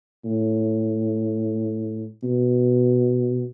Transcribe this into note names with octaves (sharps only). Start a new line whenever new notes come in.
A2
B2